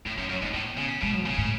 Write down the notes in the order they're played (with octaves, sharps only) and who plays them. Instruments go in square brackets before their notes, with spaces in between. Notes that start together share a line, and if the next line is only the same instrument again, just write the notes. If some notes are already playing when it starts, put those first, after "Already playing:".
[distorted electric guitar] A2 [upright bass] A3
[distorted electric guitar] F#2 [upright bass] A3
[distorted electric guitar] F#2
[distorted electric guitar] G#2 [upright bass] B3
[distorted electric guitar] A2 [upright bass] B3
[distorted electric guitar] C#3
[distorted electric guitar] B2 [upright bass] G#3
[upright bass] F#3
[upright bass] A2 [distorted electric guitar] C#3
[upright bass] A2